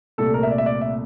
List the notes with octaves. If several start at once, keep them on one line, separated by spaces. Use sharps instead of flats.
C2 A#2 A3 A4
A#4
E5
D5
E5
D5
E5